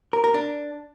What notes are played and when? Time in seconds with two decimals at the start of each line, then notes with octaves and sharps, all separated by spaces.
0.13 A#4
0.24 A#4
0.34 D4